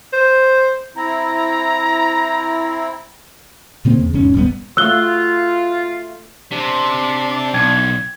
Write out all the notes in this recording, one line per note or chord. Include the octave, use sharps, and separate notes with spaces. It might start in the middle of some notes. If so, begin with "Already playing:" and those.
C5
C4 E4 A#5
A#2 C#3 A#3 C4
E2 C#3
E1 G#2 C#4
D#1 G#1 G3 B3
A3 F4 F#4 C#5 E6 F#6 G7
C3 D4
B1 G5 G#6